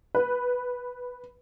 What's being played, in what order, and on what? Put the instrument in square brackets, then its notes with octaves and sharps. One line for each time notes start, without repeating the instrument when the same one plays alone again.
[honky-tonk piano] B4